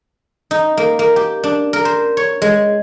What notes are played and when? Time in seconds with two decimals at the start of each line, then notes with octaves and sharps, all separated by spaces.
0.51 D#4
0.77 A#3
0.99 A#3
1.16 G4
1.44 D4
1.73 A#4
1.85 C5
2.17 C#5
2.42 G#3